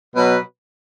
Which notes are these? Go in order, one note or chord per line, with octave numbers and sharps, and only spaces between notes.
B2 F#3 B4